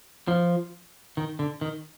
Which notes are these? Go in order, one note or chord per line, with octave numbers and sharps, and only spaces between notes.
F3
D#3
D3
D#3